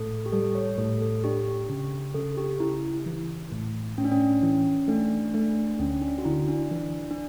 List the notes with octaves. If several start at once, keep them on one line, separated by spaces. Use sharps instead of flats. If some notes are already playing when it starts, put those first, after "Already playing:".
Already playing: A2 A4
G4
G3 A4
C#5
A2 A4
A4
D4 G4
C#3
C#3 A4
G4
C#3 E4
E3
A2
A2 C#4
D4
C#4
E3
A3 D4
A3 D4
D2 C#4
D4
F#4
D3 E4
D4
E3 D4
D4